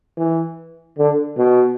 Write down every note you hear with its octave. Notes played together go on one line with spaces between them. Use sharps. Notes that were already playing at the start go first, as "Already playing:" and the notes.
E3
D3
B2